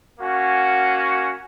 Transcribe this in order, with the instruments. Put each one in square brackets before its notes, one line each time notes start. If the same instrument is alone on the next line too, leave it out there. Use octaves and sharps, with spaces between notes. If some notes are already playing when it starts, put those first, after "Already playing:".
[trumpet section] A#3 C#4 F#4